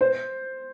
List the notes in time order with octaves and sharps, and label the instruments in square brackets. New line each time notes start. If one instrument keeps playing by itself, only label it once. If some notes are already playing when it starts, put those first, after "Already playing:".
[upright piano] C5